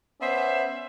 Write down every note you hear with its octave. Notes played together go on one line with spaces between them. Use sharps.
B3 C#4 C5 D5 E5